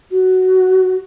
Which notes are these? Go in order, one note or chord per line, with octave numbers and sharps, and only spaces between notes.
F#4